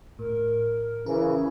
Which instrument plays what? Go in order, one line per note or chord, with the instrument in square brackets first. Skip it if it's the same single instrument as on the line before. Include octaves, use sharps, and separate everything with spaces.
[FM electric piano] A2 [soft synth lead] A#4
[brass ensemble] C#3 E3 [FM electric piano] A#4